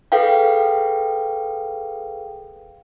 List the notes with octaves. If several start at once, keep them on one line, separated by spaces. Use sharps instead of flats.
G#4 A4 B4 F5 G5